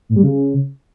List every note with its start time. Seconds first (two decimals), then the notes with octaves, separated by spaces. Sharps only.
0.09 A2
0.16 G3
0.23 C#3